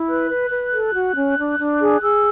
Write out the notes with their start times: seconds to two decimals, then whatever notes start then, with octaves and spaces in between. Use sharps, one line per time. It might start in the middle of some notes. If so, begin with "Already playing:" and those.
Already playing: E4
0.08 B4 F#6
0.30 B4
0.51 B4
0.72 A4
0.94 F#4
1.15 C#4
1.37 D4
1.59 D4
1.79 G#4
2.01 G#4 E6